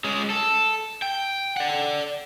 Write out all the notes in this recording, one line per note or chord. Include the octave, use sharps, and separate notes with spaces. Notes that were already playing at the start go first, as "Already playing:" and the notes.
G#3 C#4
A4
G5
D5 F#5